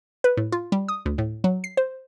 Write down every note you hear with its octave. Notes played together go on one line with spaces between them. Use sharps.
B4
A2
F4
G3
D#6
D2
A2
F#3
C7
C5